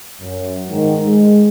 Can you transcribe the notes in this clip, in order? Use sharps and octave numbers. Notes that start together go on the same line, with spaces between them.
F#2
G#2 D#3
G#3